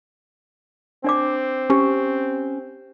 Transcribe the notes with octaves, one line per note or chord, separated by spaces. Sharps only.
C4 D4 D5 D6
C#4 G4